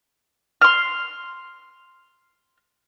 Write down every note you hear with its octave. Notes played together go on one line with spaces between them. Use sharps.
C6 F6